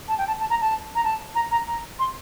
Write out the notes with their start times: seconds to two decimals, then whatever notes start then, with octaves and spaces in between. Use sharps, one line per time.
0.08 A5
0.18 G5
0.27 A5
0.40 A5
0.50 A#5
0.61 A5
0.95 A#5
1.04 A5
1.35 A#5
1.51 A#5
1.67 A#5
1.99 C6